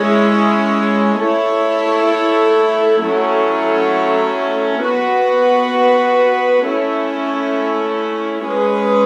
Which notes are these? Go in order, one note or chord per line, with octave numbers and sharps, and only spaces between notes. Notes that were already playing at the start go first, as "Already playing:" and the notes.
Already playing: G#3 C#4 E4 G#4 C#5
A3 E4 A4 C#5
F#3 A3 C#4 E4
B3 F#4 B4
A3 C#4 E4
G#3 C#4 G#4 B4